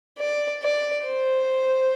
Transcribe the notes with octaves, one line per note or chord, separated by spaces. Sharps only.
D5
D5
C5